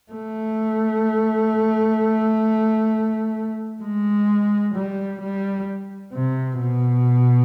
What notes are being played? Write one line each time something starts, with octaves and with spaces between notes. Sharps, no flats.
A3
G#3
G3
G3
C3
B2